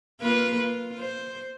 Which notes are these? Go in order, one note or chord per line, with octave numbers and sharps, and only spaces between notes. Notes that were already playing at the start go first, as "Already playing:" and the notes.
A#3 F4 B4
F4
C5